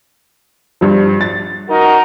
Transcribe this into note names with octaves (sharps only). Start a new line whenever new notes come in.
G2 F3
A6
D#4 F#4 A#4